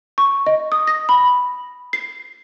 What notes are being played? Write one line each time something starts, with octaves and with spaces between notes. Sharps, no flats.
C#6
D#5
D#6
A#6
B5
C7